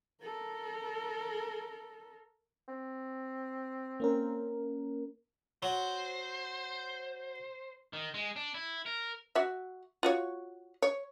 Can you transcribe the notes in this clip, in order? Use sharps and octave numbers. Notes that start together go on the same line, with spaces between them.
A4 A#4
C4
A#3 C#4 A#4
F#3 C5
D#3
G#3
D4
E4
A#4
F#4 E5
F4 F#4 C#5
C#5